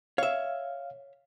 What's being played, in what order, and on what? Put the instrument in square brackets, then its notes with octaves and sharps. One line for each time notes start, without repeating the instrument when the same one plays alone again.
[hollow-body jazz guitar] C#5 E5 [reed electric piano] F5